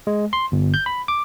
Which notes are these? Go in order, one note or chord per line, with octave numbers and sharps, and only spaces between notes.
G#3
C6
G1
G6
B5
D6